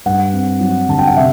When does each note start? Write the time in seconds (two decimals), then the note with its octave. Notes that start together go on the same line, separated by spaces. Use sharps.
0.06 G2 F#5
0.33 C4
0.60 F#3
0.89 D3 A5
0.99 G5
1.07 F#5
1.16 C3 E5